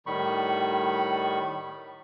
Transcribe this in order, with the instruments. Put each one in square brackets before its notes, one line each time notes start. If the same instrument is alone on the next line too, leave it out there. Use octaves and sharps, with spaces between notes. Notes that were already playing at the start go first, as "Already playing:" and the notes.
[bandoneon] A2 D#3 G3 B5 C#6